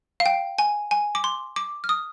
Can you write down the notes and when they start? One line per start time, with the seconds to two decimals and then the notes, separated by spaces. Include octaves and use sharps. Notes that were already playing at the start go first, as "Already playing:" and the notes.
0.20 F5
0.26 G5
0.58 G#5
0.91 G#5
1.15 D6
1.24 C6
1.56 D6
1.84 F6
1.89 D#6